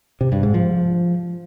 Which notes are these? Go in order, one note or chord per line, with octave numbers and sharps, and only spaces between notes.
C3
G2
G#2
F3